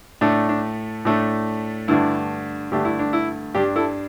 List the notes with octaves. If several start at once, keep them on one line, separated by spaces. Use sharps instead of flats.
A2 A3 D4
D4
A2 A3 D4
G2 D3 A3 D4 E4
G2 D3 A3 D4 G4
E4
D4
E4
G2 G3 D4 G4
E4 A4